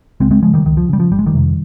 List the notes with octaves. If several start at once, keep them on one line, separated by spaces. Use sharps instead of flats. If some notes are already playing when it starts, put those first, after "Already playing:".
C#2 G#3 C4
G#3 C4
C#3 F3 G#3
D#3 G3
C#2 D#3
F3
C#3 G3
F3
G1 G3
G#3
D#3 G3
F2 C3